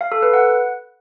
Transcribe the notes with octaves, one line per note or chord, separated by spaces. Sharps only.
F5
A4
B4
F#5